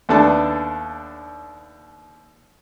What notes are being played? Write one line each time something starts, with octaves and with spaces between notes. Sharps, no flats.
D#2 A3 B3 D4 A5